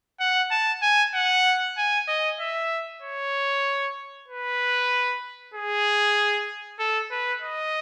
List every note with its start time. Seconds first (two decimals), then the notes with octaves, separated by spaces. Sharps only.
0.20 F#5
0.51 A5
0.82 G#5
1.14 F#5
1.77 G#5
2.08 D#5
2.40 E5
3.02 C#5
4.28 B4
5.54 G#4
6.80 A4
7.11 B4
7.42 D#5